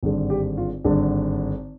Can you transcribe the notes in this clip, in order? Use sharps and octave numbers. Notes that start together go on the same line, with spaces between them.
G#1 G2 D3
G4
F4
G#1 G2 D3 D4